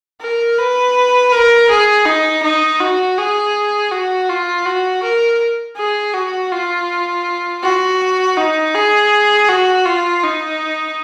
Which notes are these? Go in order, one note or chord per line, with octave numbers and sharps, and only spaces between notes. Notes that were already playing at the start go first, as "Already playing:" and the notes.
A#4
B4
A#4
G#4
D#4
D#4
F#4
G#4
F#4
F4
F#4
A#4
G#4
F#4
F4
F#4
D#4
G#4
F#4
F4
D#4